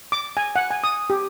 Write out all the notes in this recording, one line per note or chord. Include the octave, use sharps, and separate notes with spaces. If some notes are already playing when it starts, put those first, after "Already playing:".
D6
G#5
F#5
G#5
D#6
G4